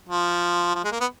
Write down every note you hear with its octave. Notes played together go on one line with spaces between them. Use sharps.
F3
F3
G#3
A#3
B3